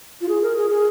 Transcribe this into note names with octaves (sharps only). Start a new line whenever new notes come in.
F4
G#4
A#4
G#4
G#4